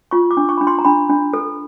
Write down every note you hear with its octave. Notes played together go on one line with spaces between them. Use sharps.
F4 C#6
D6
D4
C#6
D4 B5
C6
A#5
D4 B5
D4
A4